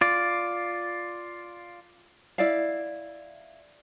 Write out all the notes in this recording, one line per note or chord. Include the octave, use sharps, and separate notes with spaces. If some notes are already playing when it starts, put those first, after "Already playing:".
F4 D5
E4 D5 F5